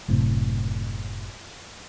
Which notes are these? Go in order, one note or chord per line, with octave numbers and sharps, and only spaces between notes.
F#1 A2 C3